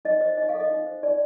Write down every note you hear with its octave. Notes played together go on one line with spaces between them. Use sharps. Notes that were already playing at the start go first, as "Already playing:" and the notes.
D#4 D#5
C5 D#5
D#4 D#5
F5
A4
D#5
D#4
C5
D#4 D5